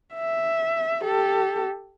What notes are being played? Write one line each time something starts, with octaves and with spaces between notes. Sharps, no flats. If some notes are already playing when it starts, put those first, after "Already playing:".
E5
G4 A4